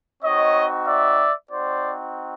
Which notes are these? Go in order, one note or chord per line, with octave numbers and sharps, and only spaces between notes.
C4 D#4 F#4 C#5 D#5
D5 E5
C4 D#4 F#4 C5 D5